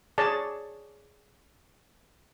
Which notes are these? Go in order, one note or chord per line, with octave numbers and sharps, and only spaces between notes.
G#4 C#5 D5 A5